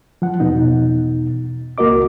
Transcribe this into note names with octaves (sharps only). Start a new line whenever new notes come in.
F3 F#5
E2 B2 D#4
C#2 A#3 F#4 A#4 D#5 D6